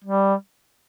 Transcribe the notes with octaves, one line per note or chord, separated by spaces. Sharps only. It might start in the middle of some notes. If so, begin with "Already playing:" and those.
G3